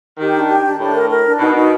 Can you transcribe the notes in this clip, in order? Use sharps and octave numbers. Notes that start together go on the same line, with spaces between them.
D#3 G4
D4
G4
D4
A2 D4
A#4
A#4
D4
B2 D#4
D#4